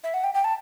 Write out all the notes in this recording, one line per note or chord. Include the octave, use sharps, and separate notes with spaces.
E5
F#5
G5
G5
A5